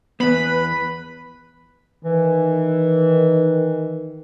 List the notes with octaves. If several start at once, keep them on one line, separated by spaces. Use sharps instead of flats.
E2 B3 B4 B5
D#3 E3